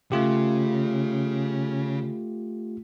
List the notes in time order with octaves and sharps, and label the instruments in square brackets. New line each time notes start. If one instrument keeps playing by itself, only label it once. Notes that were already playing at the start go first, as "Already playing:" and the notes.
[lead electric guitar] C#3 [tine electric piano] A3 F4 G4